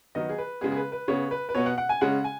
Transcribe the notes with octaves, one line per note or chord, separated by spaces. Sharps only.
D#3 F#3 B3 D#5
G#4
B4
C#3 G#3 B3 G#4
G#4
B4
B4
C#3 B3 C#5
B4
B4
B2 B3 C#5
F#5
F#5
G#5
C#3 G#3 C#4 F#5
G#5